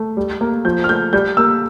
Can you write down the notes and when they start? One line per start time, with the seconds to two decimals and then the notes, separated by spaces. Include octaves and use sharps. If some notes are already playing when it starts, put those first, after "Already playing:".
Already playing: A3
0.17 G3
0.41 A#3
0.65 F3 G6
0.84 F6
0.89 A3 G6
1.13 G3 G6
1.37 A#3 E6